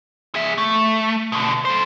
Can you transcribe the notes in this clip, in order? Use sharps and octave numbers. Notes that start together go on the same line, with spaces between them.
G#4 E5
A3
B2 D3
A4 C5